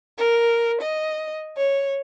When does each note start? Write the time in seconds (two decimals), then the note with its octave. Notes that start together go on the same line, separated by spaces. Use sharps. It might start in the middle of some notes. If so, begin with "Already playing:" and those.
0.17 A#4
0.81 D#5
1.57 C#5